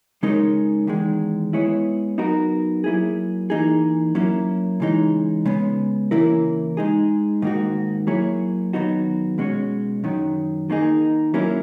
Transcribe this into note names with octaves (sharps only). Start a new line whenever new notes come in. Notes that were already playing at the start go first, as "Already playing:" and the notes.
C#3 G#3 D#4 A#4 C#5
E2 D#3 G#3
G#3 B3 E4 G#4 C#5
F#3 B3 D#4 F#4 A#4
F#3 A#3 E4 G#4
E3 A#3 D#4 G#4
F#3 A#3 C#4 E4
C#3 E3 G#3 D#4
C#3 G#3 B3
C#3 E3 A#3 E4 A#4
G#3 D#4 G#4
G#2 D#3 A#3 D#4 F#4
F#3 A#3 E4 G#4 C#5
D#3 F#3 B3 D#4 F#4
B2 G#3 C#4 F#4 C#5
F#2 D#3 F#3
D#3 A#3 D#4 G#4
F#3 A#3 C#4 E4